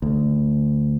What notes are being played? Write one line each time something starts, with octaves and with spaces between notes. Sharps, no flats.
D2